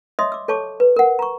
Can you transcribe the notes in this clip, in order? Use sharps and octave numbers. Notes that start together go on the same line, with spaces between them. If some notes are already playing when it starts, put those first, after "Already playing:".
C#5 D#5 E5 C6 D#6
D6 E6
A4 C#5 A5 C#6 D6
B4
A#4 F#5
A#5 C#6